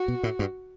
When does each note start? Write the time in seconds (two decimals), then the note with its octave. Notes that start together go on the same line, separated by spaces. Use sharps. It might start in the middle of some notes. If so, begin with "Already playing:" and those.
Already playing: F#4
0.08 B2
0.23 A2
0.39 G2